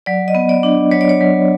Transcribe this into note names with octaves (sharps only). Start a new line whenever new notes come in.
F#3 D5
D#5
B3
D5
D4
F#3 C#5
D5
C#5
F#3